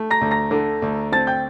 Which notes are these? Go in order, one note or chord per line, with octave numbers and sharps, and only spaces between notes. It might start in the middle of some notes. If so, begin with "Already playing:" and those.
Already playing: A3
A#5 A#6
D2
A#5 A#6
D3
D2
C4 A5 A6
G5 G6